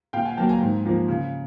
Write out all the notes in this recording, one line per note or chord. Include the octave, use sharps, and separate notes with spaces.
A#2 F5 G5
F#5 G#5
F#3 A#3 G5 A5
G#5 A#5
G#2
F3 A#3
C#3